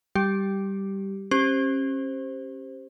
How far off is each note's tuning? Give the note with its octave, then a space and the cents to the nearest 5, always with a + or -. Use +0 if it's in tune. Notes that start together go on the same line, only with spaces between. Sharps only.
G3 +0 G4 -10
C#4 -35 G4 +0 C5 +0